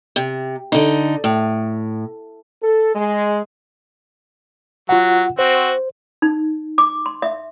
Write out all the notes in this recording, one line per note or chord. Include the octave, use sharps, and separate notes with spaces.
C3
D3 D#4
A2
A4
G#3
F#3 F4 F#5
C4 F#4 C5
D#4
D6
C6
E5